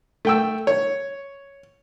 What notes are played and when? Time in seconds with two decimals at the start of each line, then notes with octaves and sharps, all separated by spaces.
0.25 A3 G5 E6
0.67 C#5